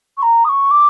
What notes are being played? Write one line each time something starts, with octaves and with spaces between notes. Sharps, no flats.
C#6
A#5
D#6
C#6
D6